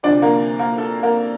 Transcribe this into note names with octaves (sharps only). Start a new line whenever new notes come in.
D2 C3 F3 C4 D4 D5
A#3 A#4
A#3 A#4
A4
A#3 A#4